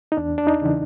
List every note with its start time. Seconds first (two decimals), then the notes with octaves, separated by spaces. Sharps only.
0.12 D#4
0.17 E2 D4
0.38 D4
0.47 D#4
0.62 C#3 E3